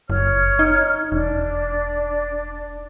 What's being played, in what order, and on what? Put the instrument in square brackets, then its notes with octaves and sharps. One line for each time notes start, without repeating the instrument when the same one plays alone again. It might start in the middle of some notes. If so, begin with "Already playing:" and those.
[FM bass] F#1 [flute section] C#5 F6
[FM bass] D#4
[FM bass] E1 [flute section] D4